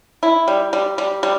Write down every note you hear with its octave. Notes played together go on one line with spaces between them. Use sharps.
E4
G3
G3
G3
G3